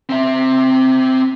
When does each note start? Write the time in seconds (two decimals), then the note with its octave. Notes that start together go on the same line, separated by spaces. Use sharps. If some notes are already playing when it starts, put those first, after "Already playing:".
0.09 C4 E5